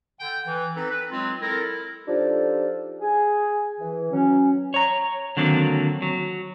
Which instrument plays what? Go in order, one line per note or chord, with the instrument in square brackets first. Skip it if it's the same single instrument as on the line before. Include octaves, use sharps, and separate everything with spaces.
[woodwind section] D3 G5
E3
C4 D#4 A4 B4
B4
F#3 G#3 C4 F4
E4 A4 A#4
F3 D4 D#4 F4 G4 A4
G#4 G#5
E3
F#3 C#4
[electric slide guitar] C#5 A#5
D3 D#3 F#3 A#3 C4
F#3